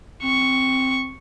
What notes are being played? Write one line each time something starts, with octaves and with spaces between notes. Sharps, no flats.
C4 C#6